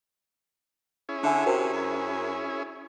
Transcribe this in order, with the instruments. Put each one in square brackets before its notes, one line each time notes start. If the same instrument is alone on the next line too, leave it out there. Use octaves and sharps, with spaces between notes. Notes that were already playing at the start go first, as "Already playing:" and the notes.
[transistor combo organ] C#4 E4 G#4
[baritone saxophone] D3 [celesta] D4 E5 G#5
[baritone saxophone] C3 [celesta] F#4 A#4 C5
[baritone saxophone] F#2